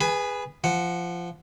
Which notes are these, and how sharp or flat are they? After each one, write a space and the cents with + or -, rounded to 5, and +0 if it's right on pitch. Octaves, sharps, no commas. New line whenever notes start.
G#4 -20 B4 +0 G#5 +35
F3 -15 F#5 +0